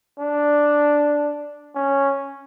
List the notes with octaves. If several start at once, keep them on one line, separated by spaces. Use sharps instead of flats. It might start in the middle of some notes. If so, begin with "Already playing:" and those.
D4
C#4